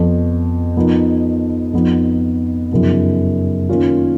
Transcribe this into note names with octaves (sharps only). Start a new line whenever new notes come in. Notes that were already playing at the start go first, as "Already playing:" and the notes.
Already playing: F2 F3 B3
F3 B3 D#4 A#4
F2 F3 B3 D#4
F#2 C#3 F3 B3 D#4
D#3 A#3 C#4 F4